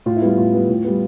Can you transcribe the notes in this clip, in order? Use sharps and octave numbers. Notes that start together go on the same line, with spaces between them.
A2 F4
E4
G3 B3 F4
A2 F4
G3 B3
A2
G3 B3